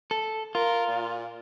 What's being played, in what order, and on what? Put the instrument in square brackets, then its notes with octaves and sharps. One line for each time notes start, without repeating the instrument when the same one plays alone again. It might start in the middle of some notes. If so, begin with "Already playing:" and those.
[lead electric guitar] A4
[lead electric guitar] F4 [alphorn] A#4
[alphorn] A#2